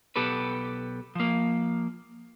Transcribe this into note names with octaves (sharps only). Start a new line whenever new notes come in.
B1 B3 G4 A4 B4
F3 A#3